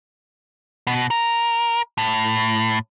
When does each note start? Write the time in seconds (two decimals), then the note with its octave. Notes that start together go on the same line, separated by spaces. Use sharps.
0.87 B2
1.11 A#4
1.98 A2